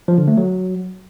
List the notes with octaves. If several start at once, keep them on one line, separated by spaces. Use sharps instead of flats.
F3
D3
A3
F#3